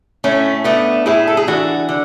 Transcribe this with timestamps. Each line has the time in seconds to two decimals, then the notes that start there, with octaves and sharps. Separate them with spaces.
0.24 A2 A3 C#4
0.64 A3 B3 D4
1.06 A2 E4 G#4
1.27 A4
1.37 G#4
1.47 E3 D4 F#4
1.89 D3